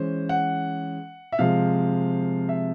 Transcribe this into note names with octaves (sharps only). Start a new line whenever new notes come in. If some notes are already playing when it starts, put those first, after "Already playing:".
Already playing: E3 G#3 C#4 C5
F#5
E5
C3 F3 G#3 F5
E5